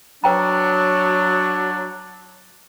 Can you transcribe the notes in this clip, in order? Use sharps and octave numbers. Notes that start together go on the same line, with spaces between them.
F#3 D4 B4 G5 A#5